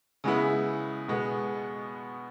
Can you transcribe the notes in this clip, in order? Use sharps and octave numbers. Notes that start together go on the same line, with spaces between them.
C#3 G#3 B3 E4
B2 G#3 B3